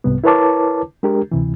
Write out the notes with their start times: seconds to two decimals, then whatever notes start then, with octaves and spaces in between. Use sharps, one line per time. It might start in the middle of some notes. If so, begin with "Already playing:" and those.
0.04 C2 G#2 C3 G3 B3
0.24 E4 A#4 B4 C#5 A5 D6
1.03 G#3 D4 G4 A#4
1.32 D2 C3 E3